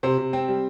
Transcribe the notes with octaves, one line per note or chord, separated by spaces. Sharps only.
C3 C5
C3
C4
G3